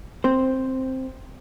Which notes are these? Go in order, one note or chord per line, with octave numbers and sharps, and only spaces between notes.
C4 C5